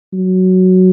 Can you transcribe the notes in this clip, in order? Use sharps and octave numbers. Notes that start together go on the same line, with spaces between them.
F#3